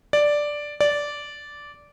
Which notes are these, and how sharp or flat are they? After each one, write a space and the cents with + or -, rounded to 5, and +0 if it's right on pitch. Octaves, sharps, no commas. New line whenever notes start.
D5 +0
D5 -10